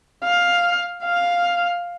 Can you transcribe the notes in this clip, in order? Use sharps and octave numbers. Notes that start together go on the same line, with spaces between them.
F5
F5